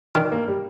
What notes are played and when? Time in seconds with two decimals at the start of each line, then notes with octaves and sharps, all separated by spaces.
0.15 D#3 D4
0.32 A#3
0.48 G3